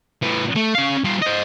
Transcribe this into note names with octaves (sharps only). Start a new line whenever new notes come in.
A2 B3
A3
C#4 F5
G3 F4
C5 D#5